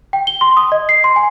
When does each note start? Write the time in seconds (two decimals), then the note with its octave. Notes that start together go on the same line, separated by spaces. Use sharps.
0.13 G5
0.27 G7
0.41 C6
0.57 D#6
0.72 D#5
0.89 C7
1.04 C6
1.16 G#5